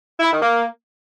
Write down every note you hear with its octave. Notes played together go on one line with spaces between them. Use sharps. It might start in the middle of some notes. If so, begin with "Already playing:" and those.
E4
D#3
A#3